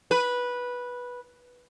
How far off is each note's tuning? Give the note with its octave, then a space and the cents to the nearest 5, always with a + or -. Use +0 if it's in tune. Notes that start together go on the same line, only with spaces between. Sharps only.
B4 -10